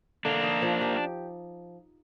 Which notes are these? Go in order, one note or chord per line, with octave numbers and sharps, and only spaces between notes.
D3 A#3 D4
D#4
F3
G4